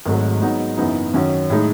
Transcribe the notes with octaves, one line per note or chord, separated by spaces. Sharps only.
G#1 G#2 F#3 A3
G#2 F#3 B3 D#4
F#1 F#2 E3 B3 D#4
F#2 D#3 F#3 C#4
A2 G#3 D#4